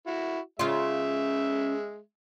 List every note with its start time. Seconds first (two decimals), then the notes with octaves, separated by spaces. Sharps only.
0.07 E4 F#4
0.59 C#3 G#3 F4 E5